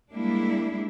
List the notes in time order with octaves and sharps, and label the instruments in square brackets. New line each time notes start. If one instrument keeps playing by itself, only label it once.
[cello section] G3 G#3 A#3 D4 E4